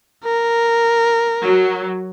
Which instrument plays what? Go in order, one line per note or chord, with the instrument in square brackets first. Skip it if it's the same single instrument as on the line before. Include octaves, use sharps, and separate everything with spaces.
[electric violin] A#4
[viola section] F#3